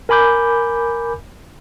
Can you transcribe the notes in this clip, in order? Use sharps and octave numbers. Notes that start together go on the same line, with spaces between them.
A#4 G#5 B5 D6 G6